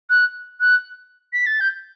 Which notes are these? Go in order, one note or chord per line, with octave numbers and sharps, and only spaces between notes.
F#6
F#6
B6
A6
G6